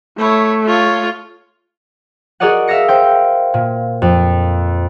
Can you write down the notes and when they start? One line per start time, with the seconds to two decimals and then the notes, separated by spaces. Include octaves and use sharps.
0.18 A3 E4 C#5
0.67 F4 C#5
2.40 F#4 G#4 A#4 D5 D#5 F#5
2.67 E5 F5 E6 A#6 C#7
2.88 C5 G5
3.54 A#2
4.02 F2